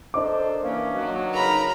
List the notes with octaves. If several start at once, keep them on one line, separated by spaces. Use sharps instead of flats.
D4 A4 A#4 C5 D#5 D6
E3 A#3 C#4
B2 D#3 F#3
C#3 D#4 A#4 A#5 B5